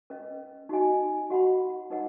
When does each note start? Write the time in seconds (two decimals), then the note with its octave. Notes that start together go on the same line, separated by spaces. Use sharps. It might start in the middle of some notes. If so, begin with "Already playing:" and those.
0.10 C#4 B4 D#5
0.69 D#4 F#4 D#5 G#5
1.30 F#4 D#5 F#5 B5
1.90 D#4 B4 D#5 F#5